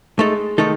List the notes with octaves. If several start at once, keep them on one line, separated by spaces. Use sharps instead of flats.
G#3 A3 D#4 A4
D#3 A3 D#4 A4